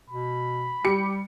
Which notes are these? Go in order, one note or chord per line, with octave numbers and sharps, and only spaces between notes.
B2 B5
G3 G4 C#7